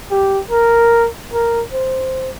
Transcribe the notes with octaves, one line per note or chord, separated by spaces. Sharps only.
G4
A#4
A#4
C5